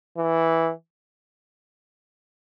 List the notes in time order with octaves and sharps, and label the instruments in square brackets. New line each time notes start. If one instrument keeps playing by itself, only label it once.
[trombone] E3